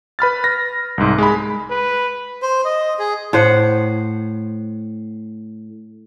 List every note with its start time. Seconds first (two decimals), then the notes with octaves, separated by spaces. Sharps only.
0.19 B4 B5 F6 A6
0.44 A#6
0.98 C2 G#2
1.18 G#3 B5
1.70 B4
2.42 C5
2.65 D#5
2.99 G#4
3.33 A2 C5 F#5